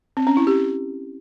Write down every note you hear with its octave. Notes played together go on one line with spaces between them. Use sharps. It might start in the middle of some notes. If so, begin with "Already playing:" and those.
C4
C#4
E4
G4